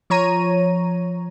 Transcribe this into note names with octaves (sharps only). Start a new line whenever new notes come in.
F3 C#5 A#5 D#7